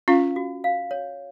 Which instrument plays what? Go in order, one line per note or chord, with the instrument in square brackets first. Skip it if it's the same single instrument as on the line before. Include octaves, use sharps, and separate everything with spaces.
[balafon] C#4 F4 [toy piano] F5
[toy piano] F#4
F5
C#5